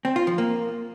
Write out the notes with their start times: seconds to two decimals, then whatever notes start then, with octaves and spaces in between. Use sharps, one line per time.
0.05 C4
0.16 F4
0.27 F3
0.38 A#3